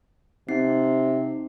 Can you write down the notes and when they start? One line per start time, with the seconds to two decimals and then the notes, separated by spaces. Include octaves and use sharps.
0.49 C3 C4 D#4 C7